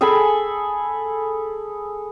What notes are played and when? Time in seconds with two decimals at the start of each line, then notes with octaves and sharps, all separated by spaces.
0.01 G#4 A4 G#5 B5